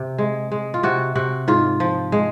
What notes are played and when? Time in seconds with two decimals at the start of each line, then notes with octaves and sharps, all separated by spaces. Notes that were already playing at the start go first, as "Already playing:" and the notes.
Already playing: C3
0.18 G#3
0.52 G#3
0.74 F4
0.83 C3 F#4
1.15 C3 F#4
1.48 G#2 F4
1.80 F3
2.12 G#3